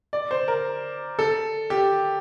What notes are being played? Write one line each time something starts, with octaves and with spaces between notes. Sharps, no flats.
D5
C5
A#4
A4
G4